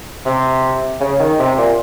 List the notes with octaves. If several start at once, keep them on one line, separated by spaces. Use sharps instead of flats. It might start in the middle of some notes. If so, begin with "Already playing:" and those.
C3
C#3
D#3
C3
A#2